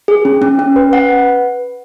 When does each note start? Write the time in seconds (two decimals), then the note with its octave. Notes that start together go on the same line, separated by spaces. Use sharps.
0.08 G#4
0.25 C#4
0.42 C#4
0.59 C#4
0.76 B4
0.93 F#5
1.09 B4